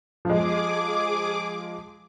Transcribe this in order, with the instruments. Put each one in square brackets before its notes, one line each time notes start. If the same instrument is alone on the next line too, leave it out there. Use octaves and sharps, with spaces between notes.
[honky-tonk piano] F3 G#3 [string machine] G#4 D6